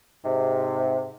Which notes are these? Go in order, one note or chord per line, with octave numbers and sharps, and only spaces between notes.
G#2 C3